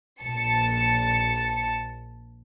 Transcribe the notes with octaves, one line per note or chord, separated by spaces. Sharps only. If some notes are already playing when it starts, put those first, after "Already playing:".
A#1 A5 C#7